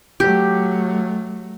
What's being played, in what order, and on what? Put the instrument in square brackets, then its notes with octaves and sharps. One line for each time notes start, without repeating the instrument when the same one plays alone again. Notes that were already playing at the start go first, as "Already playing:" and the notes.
[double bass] F#3 A3 [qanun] G4